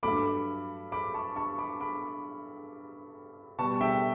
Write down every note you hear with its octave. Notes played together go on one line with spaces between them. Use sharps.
G2 F#3 A3 B5 D6
B5 D6
A5 C#6
A5 C#6
B5 D6
B5 D6
B2 G3 B3 A5 C#6
E5 G5